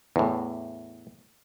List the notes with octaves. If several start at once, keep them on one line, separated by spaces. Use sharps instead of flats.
E2 A2